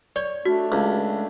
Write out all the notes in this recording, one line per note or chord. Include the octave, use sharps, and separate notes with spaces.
C#5 D5
A3 D4 F#4
C#2